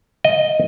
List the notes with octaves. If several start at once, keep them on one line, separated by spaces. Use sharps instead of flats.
D#5